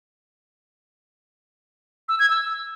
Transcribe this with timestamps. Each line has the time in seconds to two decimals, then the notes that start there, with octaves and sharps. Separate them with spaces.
2.09 E6
2.19 G#6
2.30 E6